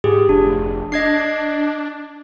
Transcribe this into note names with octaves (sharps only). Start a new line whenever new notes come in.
G#2 G4 G#4
F1 D4
D4 D#5 G#6 C7